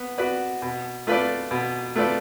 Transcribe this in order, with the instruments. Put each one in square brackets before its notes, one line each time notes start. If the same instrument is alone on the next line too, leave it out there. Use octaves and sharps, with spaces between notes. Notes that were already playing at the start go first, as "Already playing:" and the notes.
Already playing: [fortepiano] B3
F#4 B4 D5
B2
A3 F4 B4 D5
B2
A3 F4 B4 D5